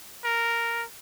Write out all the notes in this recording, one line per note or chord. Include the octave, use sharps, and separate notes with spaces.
A#4